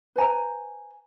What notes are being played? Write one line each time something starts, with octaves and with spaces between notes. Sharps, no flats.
B4 C5 G#5 A#5